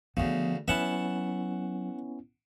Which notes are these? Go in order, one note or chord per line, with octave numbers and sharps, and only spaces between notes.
D2 C#3 F3 B3
F#3 B3 C#4 E4 E5 F#5 A5